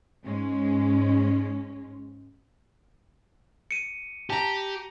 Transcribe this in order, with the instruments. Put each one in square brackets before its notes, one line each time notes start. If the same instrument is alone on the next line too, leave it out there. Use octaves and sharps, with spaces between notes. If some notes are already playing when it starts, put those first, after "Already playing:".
[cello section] G#2 G#3 C#4
[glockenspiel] C#7 D#7
[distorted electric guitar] G4 [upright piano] A5 A#5